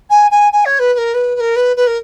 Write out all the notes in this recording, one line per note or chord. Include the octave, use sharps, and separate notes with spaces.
G#5
G#5
G#5
C#5
B4
B4
A#4
B4
B4
A#4
B4
B4
A#4